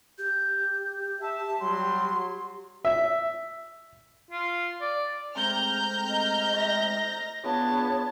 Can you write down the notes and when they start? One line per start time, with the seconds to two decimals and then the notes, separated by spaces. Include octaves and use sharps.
0.18 G4 G6
1.21 E5 A5
1.60 F#3 G3 C6
2.85 E5
4.31 F4
4.81 D5
5.35 G#3 A3 C4 A#5 F6 G6
6.09 D#5
6.55 A#6
7.43 B3 D4 F4 G#4 C#5 A5